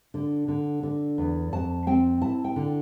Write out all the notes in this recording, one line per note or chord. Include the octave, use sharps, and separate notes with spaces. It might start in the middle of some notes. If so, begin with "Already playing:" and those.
D3
D3
D3
E2
F2 A5
C4 G5
E4 A5
G5
D3